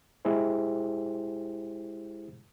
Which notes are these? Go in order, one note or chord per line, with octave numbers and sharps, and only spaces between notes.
G#3 E4 G4 G#4 C5